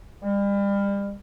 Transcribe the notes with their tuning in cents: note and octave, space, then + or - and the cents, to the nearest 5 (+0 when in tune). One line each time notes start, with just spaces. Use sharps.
G3 +35